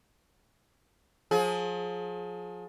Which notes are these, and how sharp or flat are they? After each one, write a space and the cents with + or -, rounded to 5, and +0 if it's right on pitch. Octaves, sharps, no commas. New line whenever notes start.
F3 +35 G#4 +25